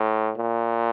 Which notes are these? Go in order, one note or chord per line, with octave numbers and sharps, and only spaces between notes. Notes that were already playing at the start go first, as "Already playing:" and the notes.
Already playing: A2
A#2